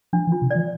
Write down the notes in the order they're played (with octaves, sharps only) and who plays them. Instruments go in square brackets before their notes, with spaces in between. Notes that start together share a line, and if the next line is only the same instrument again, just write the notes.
[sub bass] F3 [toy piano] D4
[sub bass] E3
[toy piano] F4
[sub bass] C3
[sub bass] E3 [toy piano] D5